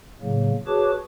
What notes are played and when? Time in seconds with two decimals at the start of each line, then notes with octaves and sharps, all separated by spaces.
0.22 A2 C#3 F#3 A#3
0.67 F#4 G#4 B4 C#5 A5 D6